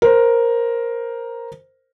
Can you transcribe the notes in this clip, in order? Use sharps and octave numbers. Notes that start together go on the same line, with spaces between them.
A#4 C5